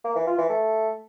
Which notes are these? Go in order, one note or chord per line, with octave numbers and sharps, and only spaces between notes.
A#3
E3
F4
E3
A3